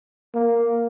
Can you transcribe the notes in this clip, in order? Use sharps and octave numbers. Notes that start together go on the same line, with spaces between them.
A#3